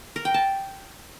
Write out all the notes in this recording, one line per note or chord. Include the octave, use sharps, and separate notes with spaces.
A#4
G5
A5